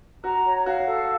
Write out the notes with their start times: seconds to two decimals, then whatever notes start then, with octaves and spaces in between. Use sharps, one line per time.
0.24 F#4 A#5
0.45 C#5
0.66 F#4 F5
0.87 A4